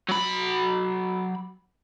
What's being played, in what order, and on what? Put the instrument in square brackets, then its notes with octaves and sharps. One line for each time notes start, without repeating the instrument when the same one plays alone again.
[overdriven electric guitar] F#3 B5